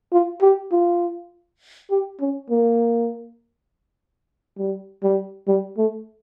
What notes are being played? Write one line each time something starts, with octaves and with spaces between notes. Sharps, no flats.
F4
G4
F4
G4
C#4
A#3
G3
G3
G3
A3